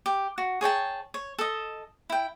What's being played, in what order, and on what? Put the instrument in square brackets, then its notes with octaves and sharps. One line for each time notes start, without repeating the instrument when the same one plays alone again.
[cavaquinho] G4
F#4
G#4 C#5 G5 A5
C#5
A4 D#5
E4 G5